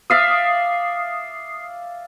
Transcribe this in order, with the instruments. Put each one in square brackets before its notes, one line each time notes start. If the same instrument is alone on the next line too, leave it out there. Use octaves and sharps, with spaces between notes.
[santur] D5 E5 F5 [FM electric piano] D#6 C7